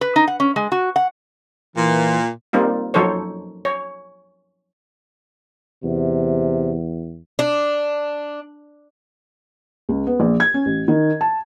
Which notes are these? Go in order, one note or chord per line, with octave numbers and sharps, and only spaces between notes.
B4
D#4
F#5
C#4
G#3
F#4
F#5
A#2 E3
G3 A#3 C4 D#4 F4
F3 F#3 D#4 A4 C5 C#5
C#5
E2 C3
D4
C#2
B3
A#1
G#6
C#4
A1
D#3
A5